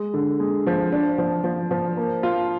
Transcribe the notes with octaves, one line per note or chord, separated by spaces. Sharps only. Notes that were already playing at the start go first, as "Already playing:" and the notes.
Already playing: G#3
D3
G#3
F3
D4
F3
F3
F3
A#3
F4